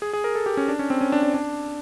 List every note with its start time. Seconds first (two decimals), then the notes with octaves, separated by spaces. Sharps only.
0.02 G#4
0.13 G#4
0.24 A#4
0.35 A4
0.46 G4
0.57 C#4
0.68 D4
0.79 C#4
0.90 C4
1.01 C#4
1.12 D4
1.23 D4
1.34 D4